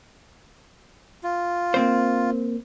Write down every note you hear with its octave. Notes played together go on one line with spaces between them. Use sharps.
F4
A#3 C4 C5